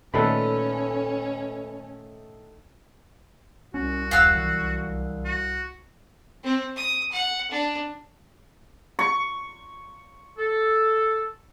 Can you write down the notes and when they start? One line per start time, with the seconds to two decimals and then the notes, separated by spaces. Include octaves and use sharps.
0.14 A#2 D#3 A3 C#4 D#4 A4 B4 B5
3.74 C2 C#4 F#4
4.11 E1 F5 F#5 E6
4.35 B1 E3
5.25 F#4
6.43 C4
6.76 D#6
7.12 F#5
7.51 D4
8.99 C#6
10.38 A4